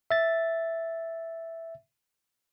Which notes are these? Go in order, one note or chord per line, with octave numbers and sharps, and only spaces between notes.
E5 A6